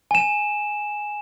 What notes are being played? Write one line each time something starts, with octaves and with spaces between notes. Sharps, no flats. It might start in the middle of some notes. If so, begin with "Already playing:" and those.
G#5 E7